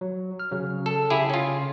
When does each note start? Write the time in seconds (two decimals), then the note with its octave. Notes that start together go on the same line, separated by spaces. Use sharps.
0.01 F#3
0.39 F6
0.51 C#3 F#3
0.86 A4
1.10 C#3 E4 G4 G#4
1.30 C#4 F4